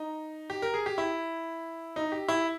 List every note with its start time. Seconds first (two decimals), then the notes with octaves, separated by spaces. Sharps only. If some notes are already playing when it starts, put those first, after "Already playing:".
Already playing: D#4
0.50 G4
0.62 A#4
0.74 G#4
0.86 G4
0.98 E4
1.96 D#4
2.12 G4
2.28 E4